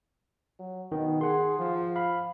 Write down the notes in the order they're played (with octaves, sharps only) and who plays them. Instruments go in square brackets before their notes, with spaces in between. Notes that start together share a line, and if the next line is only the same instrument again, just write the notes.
[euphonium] F#3
[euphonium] B2 [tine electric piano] D#3
[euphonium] G#4 [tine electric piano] F#5 C6
[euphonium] F3
[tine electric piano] F5 B5